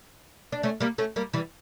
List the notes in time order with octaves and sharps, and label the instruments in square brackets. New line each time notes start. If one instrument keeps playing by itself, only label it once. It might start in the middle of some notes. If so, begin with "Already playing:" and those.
[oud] D4
A3 C#4
G3 A#3
A3 C#4
G3 A#3
E3 G3